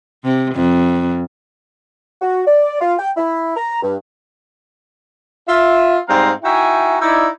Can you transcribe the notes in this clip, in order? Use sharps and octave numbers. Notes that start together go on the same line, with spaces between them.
C3
F2
F#4
D5
F4
G5
E4
A#5
G2
F4 E5
G#2 G3 C4 D#4 F5 A#5
D#4 E4 F#4 E5 G5 G#5
D#4 E4 D5